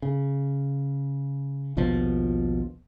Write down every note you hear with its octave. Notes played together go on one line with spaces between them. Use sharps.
C#3
A#1 D#2 B2 F3